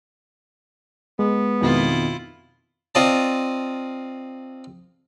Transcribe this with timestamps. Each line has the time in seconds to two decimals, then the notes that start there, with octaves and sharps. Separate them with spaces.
1.19 G#3 B3
1.61 F2 B2 D#3 E4 F4
2.95 C4 F4 D5 D#5 A5